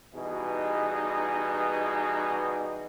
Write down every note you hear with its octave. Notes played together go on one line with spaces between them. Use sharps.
B2 E3 G3 D#4 G#4